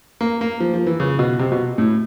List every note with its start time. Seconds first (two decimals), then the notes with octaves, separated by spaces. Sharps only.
0.21 A#3
0.41 A#3
0.60 F3
0.74 F3
0.86 E3
1.00 C#3
1.19 B2
1.39 C3
1.52 B2
1.78 A2